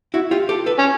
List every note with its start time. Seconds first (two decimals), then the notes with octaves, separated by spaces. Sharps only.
0.14 E4 F#4
0.31 F4 G4
0.49 G4 A4
0.66 A4 B4
0.79 C#4